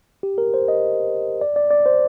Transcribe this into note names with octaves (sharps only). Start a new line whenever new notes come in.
G4
A#4
C5
D#5
D5
D5
D5
C5